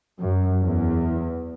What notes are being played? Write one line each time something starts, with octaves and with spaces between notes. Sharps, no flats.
F#2
E2